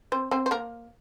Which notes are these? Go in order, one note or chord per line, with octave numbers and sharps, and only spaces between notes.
C4 C5
C4 C5
C5
A#3 A#4